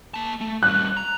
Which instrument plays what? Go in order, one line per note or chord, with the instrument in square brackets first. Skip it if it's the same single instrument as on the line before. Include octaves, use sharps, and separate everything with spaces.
[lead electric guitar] A#3 A5
A3
[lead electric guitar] G3 C#4 [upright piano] F#6
[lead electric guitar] A#5